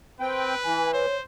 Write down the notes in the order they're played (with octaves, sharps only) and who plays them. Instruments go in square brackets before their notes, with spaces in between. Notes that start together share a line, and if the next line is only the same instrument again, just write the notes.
[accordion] C4 G5 [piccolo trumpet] B4
[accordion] E3 [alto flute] G#5
[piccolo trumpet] C5 [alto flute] C#5